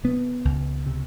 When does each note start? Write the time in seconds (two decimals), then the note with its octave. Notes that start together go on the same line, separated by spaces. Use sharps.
0.03 C3 B3
0.45 C#2
0.86 C3